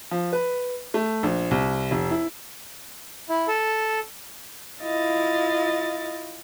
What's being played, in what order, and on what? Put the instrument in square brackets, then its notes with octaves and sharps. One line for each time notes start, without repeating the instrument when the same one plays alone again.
[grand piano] F3
B4
A3
A#1
C2
F1
E4
[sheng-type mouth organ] E4
A4
[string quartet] E4 F4 D#5 F5 A6